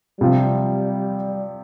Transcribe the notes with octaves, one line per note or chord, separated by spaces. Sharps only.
C3 F3 G3 C4 F4